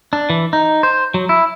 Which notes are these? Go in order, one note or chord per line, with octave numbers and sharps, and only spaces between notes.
D4
E3
D#4
C5
F#3
E4